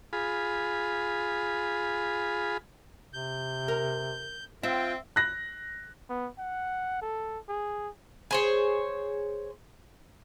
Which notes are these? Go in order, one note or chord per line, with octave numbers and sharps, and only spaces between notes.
F4 G#4 B5
C3 G6
A#4
C4 F4 E5 G5
F#6 A#6
B3
F#5
A4
G#4
G#4 C5 C#5